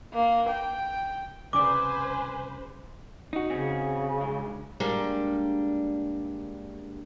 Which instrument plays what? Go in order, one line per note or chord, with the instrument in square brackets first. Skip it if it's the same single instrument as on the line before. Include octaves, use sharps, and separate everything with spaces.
[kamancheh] A#3
G5
[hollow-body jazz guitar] C2 C#3 D5 [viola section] B4 C5 [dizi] G#5 [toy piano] D6
[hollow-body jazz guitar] D#4 F#4
[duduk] C#3 [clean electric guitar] C4 C#4 G#4
[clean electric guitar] G2 G#3
[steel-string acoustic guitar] G3 G#3 A#3 D4